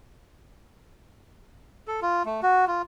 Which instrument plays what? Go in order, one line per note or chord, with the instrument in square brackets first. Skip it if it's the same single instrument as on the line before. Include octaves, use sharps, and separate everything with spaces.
[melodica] A4
F4
A3
F#4
F4